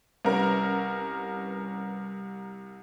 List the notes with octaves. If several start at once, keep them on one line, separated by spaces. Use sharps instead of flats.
C2 C#4 A#4 B4